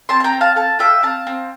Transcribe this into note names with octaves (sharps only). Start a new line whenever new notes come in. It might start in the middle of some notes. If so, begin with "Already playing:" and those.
C4 A5 C6
A5
G5 A#5
C4
F5 A5
A4 F5 A5
F4 E5 G5
C4 F5 A5
C4